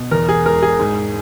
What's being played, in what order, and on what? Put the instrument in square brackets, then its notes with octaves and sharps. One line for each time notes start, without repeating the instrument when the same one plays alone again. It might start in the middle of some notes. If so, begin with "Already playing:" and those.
Already playing: [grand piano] B2
E2 A#4
G#4
E1 A#4
G#4
G#2